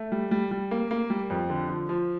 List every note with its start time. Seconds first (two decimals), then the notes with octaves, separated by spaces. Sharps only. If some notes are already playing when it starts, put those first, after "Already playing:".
Already playing: A3
0.12 G3
0.31 G3
0.51 G3
0.71 A#3
0.91 A#3
1.10 G3
1.30 F2
1.50 D3
1.69 F3
1.89 F3